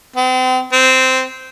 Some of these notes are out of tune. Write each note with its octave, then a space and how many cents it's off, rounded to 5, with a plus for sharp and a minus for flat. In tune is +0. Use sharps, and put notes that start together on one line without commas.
C4 -40
C4 -10